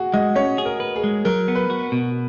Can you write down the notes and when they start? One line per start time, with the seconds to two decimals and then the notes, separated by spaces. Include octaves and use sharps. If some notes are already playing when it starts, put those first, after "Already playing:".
Already playing: F#4 G#4
0.14 G#3 D#5
0.36 C#4 C#5
0.58 G#4
0.65 A#4
0.80 B4
0.96 G#4
1.04 G#3
1.25 F#3 A#4
1.48 B3
1.55 B4
1.70 F#4
1.92 B2